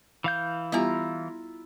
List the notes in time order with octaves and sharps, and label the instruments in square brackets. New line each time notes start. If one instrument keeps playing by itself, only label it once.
[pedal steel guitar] E3 F5 G6
[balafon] G3 B3 G4 [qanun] E4 F4 A#5